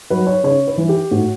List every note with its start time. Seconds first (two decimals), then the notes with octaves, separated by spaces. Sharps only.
0.10 F#3 B4
0.27 C#5
0.44 C#3 C#5
0.67 B4
0.78 E3
0.89 G4
1.11 A2 F#4